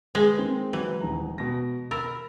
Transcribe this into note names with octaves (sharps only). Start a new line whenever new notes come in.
G#3 B4
D#3 C4
E3 F#3
D#1 E2 A#5
B2 A#6
A#4 B5 E6 A6